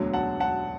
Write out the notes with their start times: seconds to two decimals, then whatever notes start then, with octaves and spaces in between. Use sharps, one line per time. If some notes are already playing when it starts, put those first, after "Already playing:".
Already playing: E1 D2 D3 F#3
0.13 F#5 A5
0.40 F#5 A5